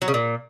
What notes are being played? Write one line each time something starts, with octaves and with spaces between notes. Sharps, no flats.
F#3
C#3
A#2